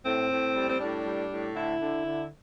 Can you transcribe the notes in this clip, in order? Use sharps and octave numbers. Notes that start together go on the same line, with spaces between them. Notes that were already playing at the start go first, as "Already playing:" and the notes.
A2 C4
A2
G3
C4
A2 D4
G3
A2
D3 E4
D3
D3